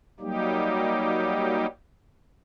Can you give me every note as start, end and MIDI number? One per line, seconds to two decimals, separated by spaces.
0.20 1.66 54
0.20 1.66 55
0.20 1.66 58
0.20 1.66 63
0.20 1.66 67